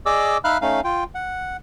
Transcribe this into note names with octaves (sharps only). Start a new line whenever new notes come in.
G#4 D5 D#5 D6 E6
D#4 E5 F5 B5 F6 F#6
A3 C#4 D#4 F5
F4 G5
F#5